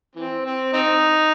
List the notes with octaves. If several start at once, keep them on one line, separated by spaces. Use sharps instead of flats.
E3 C4
C4
C4 D#4